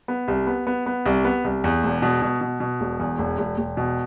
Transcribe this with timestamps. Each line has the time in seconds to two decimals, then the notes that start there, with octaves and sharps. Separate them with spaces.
0.08 B3
0.28 C2
0.47 B3
0.67 B3
0.86 B3
1.06 C2
1.24 B3
1.44 C2
1.64 E2
1.83 E1
2.02 B2
2.22 B2
2.41 B2
2.60 B2
2.80 E1
2.99 E2
3.18 E1
3.38 E1
3.58 E1
3.77 B2